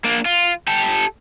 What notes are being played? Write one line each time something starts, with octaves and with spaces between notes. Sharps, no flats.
A#3 D4
F4
G4 A4